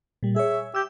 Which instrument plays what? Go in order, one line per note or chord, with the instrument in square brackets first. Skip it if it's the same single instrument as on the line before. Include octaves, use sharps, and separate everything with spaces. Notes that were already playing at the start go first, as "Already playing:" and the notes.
[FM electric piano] A#2 G3
[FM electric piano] G#4 C#5 [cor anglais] E5
[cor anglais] G4 [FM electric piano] E6 G6